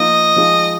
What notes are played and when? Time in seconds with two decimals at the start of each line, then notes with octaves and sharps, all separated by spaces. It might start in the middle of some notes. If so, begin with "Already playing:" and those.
Already playing: F3 A#3 D#4 D#5
0.36 F3 G#3 D#4